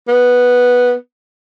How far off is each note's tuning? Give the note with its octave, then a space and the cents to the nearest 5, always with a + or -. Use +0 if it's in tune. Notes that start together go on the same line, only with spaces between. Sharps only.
B3 -5